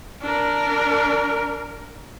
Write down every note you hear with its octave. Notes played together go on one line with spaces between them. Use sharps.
D4 A#4